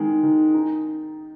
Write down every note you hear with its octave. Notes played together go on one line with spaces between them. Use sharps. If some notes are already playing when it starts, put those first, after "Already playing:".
Already playing: D#3 G#3
D#3
D#4